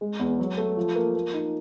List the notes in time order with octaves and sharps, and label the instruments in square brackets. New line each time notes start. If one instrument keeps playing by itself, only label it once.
[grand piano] G#3
E2
F#3
A3
F3
A#3
A#3
D#4